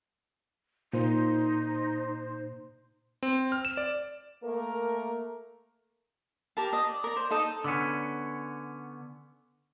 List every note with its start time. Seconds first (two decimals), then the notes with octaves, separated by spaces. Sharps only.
0.93 A#2 D#4 C5
3.23 C4
3.52 F6
3.65 E7
3.77 D5
4.44 A3 A#3 A#4
6.57 G4 A#4 A5
6.73 D#5
6.87 D5
7.04 A#4 D5
7.16 C5
7.30 D#4 A4 D#5 A5
7.64 D3 B3 C#4